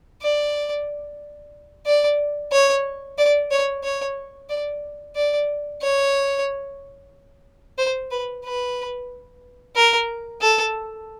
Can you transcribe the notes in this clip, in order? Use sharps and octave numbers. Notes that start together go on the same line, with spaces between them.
D5
D5
C#5
D5
C#5
C#5
D5
D5
C#5
C5
B4
B4
A#4
A4